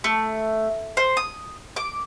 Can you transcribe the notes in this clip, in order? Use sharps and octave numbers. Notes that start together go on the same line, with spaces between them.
A3
C5
D#6
D6